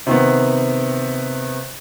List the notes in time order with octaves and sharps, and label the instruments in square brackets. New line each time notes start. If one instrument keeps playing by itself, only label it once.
[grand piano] C3 D#3 B3